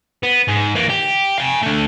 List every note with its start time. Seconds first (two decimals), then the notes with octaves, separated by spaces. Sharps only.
0.23 B3
0.48 G#2
0.75 E3 A#3
0.90 G4
1.38 F5 G#5
1.63 D3 A3